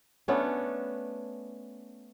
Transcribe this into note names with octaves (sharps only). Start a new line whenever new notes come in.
A3 B3 C#4 D4